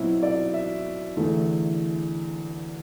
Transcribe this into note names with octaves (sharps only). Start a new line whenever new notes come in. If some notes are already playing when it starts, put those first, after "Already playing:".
Already playing: B2 F#3 C4 E4
D5
E5
E2 D3 A3 E4